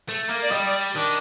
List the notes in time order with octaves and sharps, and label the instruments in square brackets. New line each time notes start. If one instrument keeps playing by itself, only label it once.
[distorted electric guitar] A3
A#3
[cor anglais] D5
[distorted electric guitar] G3 [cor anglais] D#5
[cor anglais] D5
[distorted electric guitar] D#3 [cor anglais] D4